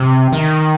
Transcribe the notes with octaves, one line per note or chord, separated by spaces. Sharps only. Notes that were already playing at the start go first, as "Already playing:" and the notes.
Already playing: C3
D#3